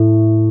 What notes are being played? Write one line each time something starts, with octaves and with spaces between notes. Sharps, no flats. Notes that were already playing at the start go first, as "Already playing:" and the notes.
Already playing: A2